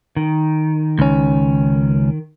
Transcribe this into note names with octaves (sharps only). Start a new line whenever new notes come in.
D#3
C#2 C#4